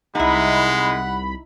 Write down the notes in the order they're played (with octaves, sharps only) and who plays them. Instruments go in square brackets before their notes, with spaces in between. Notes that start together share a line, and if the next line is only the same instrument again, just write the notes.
[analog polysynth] C2 B5 [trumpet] G#3 [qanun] D#4 E4 [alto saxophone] F#5